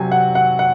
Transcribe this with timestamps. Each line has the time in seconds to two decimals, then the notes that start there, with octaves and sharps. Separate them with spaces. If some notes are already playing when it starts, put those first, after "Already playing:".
Already playing: C3 F#3 G#5
0.11 F#5
0.35 F#5
0.59 F#5